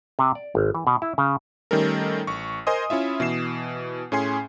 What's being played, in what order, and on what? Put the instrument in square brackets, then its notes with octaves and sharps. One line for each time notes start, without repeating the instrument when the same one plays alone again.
[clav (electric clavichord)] C3
D5
G#1
E3
B2
E4
C#3
[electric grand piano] D#3 G3 A3 C#4 A4 A#4
A1 C#6
A#4 C5 D#5 G#5 C6 D#6
C#4 E4 F4 E5
B2 E3 C7 E7
A2 C#4 G#4 G#5 C6 C7